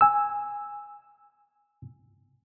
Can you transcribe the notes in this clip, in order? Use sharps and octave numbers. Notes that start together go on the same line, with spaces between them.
G#5 E6